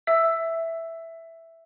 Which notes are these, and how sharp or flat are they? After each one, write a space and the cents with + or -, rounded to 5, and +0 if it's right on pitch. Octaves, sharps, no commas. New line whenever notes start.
E5 +0 E6 +5